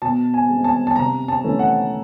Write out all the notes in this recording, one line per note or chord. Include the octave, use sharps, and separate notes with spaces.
B2 A5
G#5
G#3 C4
A5
A5
C3 A#5
A5
E3 A3 C#4
F#5